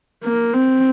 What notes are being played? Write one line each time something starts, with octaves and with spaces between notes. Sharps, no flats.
A#3
C4